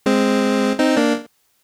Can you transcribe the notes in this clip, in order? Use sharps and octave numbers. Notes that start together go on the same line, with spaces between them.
G#3 C4
C4 D#4
A#3 D4